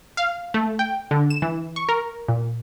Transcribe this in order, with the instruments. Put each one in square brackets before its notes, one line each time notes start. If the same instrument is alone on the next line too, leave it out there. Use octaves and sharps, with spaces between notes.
[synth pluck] F5
A3
G5
D3
E7
E3
C#6
A#4
A#2